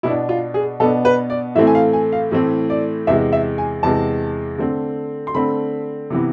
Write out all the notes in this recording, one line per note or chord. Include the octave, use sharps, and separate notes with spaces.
B2 B3 D4 E4
F4
G#4
B2 B3 D4 A4
B4
D5
A2 E3 A3 C4 E5
G#5
F5
G#5
F5
A2 E3 A3 C4
D5
E2 C3 G#3 E5
E5
G#5
E2 C3 G#3 A5
D3 A3 C4
C6
D3 A3 C4 B5
C3 E3 B3